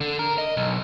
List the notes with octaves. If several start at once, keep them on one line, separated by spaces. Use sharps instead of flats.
D3
A#4
D#5
B1